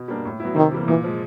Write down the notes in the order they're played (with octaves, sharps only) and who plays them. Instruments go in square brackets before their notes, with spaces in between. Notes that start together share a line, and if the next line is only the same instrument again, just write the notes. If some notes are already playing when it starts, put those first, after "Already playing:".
Already playing: [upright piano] B2
G3 A#3 D4
A2
F#3 B3 E4
[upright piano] C3 [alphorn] D#3
[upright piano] E3 G3 A#3
[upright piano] A#2 [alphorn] E3
[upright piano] F3 G#3